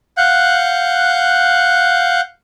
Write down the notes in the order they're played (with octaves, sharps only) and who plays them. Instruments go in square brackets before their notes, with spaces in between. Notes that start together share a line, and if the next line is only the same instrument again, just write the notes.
[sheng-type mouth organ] F5 F#5 F#6 G6